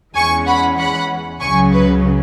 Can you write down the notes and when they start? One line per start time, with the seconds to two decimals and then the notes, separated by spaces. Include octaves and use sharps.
0.15 E2 E3 G#3 C#4 G#5 C#6
0.46 F#5 B5
0.78 F#5 B5
1.41 C#2 C#3 F#3 G#5 C#6
1.73 B4